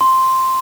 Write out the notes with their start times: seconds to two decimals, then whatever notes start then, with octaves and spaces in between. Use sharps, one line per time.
0.01 C6